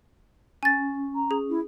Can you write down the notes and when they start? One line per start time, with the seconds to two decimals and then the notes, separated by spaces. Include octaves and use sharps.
0.63 C#4 G#5 A6
1.15 A#5
1.31 G#4
1.49 E4